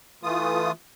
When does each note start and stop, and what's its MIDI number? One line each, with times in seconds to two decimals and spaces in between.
0.23 0.72 52
0.23 0.72 57
0.23 0.72 65
0.23 0.72 87